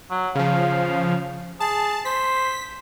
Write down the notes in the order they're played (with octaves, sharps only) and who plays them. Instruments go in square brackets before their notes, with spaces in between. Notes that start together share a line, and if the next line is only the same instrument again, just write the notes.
[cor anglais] F#3
[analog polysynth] C#3 F3 [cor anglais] F5
[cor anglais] G#4 [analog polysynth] A5
[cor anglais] C5 [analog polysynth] B6